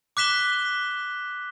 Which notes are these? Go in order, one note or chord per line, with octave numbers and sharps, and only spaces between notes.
D6 F#6 B6 E7 G7